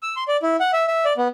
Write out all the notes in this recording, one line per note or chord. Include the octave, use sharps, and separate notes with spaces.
E6
C6
D5
E4
F#5
E5
E5
D5
B3